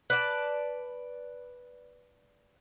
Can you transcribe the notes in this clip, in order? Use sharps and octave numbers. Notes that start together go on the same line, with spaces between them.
B4 D5 A5